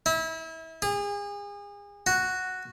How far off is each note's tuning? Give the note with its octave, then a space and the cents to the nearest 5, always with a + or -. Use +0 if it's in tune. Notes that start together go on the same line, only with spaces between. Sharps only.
E4 -30
G#4 -35
F#4 +0